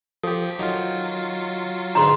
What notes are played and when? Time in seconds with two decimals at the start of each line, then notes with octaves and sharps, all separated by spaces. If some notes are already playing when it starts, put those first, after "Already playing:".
0.23 F3 G4 A4
0.59 D#3 F#3 F4
1.95 D2 G#2 B4 A#5 C6